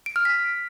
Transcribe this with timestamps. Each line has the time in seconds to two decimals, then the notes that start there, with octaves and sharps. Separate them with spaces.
0.06 D7
0.16 F6
0.25 B6